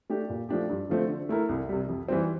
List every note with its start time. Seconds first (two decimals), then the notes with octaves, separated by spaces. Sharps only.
0.10 A3 D4 G4
0.30 A#2
0.49 F3 A3 D4 G4
0.70 G2
0.89 D3 F3 A3 C4
1.08 D3
1.29 A3 E4 A#4
1.49 C2
1.69 C3 G3
1.89 F2
2.08 E3 G3 C4